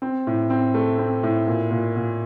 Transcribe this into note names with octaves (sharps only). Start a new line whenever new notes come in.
C4
A2
C4
A3
C4
A2
A#2
A#2
A#2